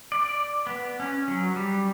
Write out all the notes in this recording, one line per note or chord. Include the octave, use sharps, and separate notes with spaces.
D5
B3
C#4
F#3
G3